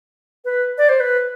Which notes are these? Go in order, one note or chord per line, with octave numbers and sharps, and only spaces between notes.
B4
D5
C5
B4